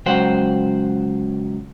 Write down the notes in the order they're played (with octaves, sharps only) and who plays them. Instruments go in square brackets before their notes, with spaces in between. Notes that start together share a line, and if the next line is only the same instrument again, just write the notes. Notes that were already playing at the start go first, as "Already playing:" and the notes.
[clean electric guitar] C#2 F#3 C5 F#5 G5